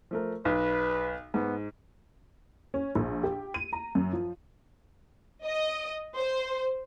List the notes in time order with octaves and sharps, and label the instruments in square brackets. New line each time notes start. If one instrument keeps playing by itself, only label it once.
[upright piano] F3 A3 A#4
[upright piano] B1 [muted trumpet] B4
[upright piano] G#2 [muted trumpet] B3
[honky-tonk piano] C#4
A#1
G4
D#7
A#5
F#2
F3
[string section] D#5
C5